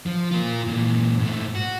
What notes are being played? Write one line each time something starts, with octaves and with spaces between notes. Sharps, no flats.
F3
F4 A#4
A#2 E3
G#2 A3
F#4